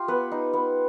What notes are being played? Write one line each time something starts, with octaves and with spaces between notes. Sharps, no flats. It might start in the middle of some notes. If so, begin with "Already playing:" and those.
Already playing: F4 G4
B3 B4
D#4
B3